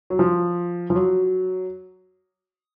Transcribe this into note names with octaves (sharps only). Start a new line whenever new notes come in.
F#3
F3
F3
F#3